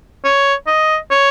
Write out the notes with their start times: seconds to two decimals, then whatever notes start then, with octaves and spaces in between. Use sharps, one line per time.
0.25 C#5
0.67 D#5
1.11 C#5